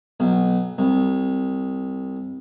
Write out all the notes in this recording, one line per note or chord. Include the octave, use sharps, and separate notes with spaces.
B1
C2